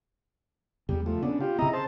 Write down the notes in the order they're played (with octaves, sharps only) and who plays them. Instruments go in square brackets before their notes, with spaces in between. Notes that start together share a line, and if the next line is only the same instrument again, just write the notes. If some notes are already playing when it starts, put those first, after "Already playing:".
[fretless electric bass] E2 C#3 [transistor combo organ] G3
[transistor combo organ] F3 A3
[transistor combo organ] C#3 D4 [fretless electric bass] B3
[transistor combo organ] F4 G4
[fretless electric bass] C#3 C4 [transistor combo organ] E4 D#5 A#5
[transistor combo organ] C5 A5